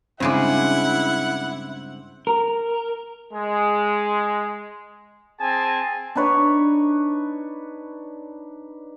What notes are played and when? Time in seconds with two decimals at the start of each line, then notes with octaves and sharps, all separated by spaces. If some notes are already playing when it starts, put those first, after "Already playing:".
0.20 G2 C#3 G#3 C4 E4 F#5 D6
2.27 A#4
3.33 G#3
5.41 C4 G#4 G#5 A5
6.15 D4 D#4 B4 C#5